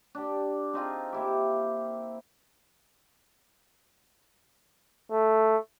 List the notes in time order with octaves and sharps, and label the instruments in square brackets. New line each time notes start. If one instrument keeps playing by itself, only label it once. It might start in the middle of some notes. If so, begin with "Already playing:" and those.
[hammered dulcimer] D4 G4
C4 D#4 F4 G#4
A#3 E4 G4
[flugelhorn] A3